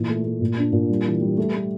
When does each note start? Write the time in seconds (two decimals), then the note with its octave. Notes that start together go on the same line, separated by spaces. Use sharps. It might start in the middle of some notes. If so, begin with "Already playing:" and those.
Already playing: A#2 E3
0.09 A3
0.25 A3
0.41 A#2
0.57 D4
0.73 A#2
0.89 G3
1.06 E3
1.21 G3
1.37 A3
1.54 A3